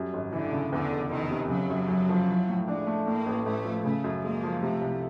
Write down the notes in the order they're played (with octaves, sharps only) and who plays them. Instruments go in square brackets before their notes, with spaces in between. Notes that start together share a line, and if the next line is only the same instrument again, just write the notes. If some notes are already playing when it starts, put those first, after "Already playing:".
Already playing: [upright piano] F#2 G3
G#1
[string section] D3 [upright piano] E3
[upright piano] C#3
[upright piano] E2 [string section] D3
[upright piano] F1
[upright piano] F1 [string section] D#3
[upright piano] C3
[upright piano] C#3 [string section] F#3
[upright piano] F#2
F#2
F3
E3
A2
[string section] G#3 [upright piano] D4
[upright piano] A3
[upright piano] A2 [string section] A#3
[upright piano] A1
[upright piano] A1 [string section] A3
[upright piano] F3
[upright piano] C#3 [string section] A3
[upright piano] F#2
[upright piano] G#3 [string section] A#3
[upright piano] F3
[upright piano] C3 [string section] A3
[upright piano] C2